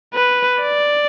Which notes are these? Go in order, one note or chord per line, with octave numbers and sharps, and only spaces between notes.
B4
D5